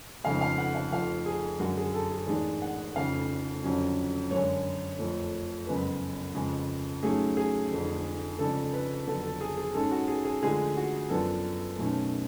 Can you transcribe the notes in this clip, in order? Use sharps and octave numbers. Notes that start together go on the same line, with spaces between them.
F1 F2 C#3 G#3 F5
F5
F#5
F5
F1 F2 F3 F5
G#4
F#2 D3 G#3 F#4
G#4
A4
G#4
A1 G#2 G#3 D4 G#4
F#5
F1 F2 C#3 F5
F2 D3 F#3 C#4
F#2 D3 G#3 C#5
F2 F3 A3
F#1 F2 C#3 G#3 B3 B4
F2 C#3 G#3
G#2 F#3 A3 C#4 G#4
G#4
F1 F2 D3
F2 C#3 G#3 D4 A4
B4
F2 D3 F#3 B3 A4
A4
G#4
G#4
G#2 G#3 C#4 A4
F#4
G#4
G#4
D2 D3 F3 G#3 G#4
F#4
F#2 F3 B3 D4 A4
B1 B2 A3 C#4